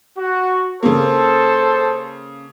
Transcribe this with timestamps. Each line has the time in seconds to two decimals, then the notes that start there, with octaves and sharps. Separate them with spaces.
0.18 F#4
0.83 C#3 A#3 A4 C5